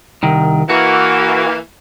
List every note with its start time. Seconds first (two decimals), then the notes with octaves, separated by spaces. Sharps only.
0.23 C2 D#3
0.69 E3 A#3 F#4